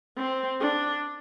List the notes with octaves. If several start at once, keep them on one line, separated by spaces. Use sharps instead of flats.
C4
D4